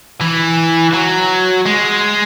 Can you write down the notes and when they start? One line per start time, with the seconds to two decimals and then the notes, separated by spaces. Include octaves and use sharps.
0.21 E3
0.94 F#3
1.66 G#3